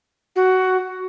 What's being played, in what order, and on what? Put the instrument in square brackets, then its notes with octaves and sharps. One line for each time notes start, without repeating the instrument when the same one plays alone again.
[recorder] F#4